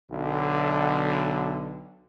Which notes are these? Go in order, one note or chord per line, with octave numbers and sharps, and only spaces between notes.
B1 D3